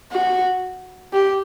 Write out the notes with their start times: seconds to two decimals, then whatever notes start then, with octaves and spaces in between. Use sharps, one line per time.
0.12 F#4
1.13 G4